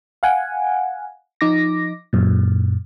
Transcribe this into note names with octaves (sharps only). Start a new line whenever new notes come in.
F5 F#5 G#5
F3 D#4 D6 A#6
F#2 A#2